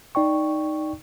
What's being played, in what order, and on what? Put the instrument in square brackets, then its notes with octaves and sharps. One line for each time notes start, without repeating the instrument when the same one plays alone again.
[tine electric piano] D#4 D5 G5 C#6